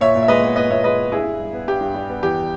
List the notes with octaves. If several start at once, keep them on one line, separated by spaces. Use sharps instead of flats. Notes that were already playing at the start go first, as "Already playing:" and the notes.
A#2 C#5 E5
A#2
E5
G#3 B4 D#5
B3
A#2 B4 D#5
A#2 C#5 E5
G#3 B4 D#5
B3
G2 E4 G#4
G2
G3
B3
G2 G4
G2
G3
B3
E2 G4